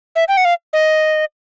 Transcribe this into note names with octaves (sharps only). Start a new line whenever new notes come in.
E5
G5
F#5
F5
D#5